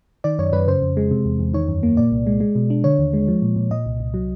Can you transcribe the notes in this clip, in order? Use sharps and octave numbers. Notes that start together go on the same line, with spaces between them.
D#3 D5
F#2 C#5
F#2 B4
C#3 C5
F2
G#3
C3
E2
E2
D#3 C#5
F#2
A#3
A#2 D5
C2
G#3
G#3
B2
D4
D3 C#5
D#2
G#3
F3
A#2
A#2
A#2 D#5
C2
C2
F#3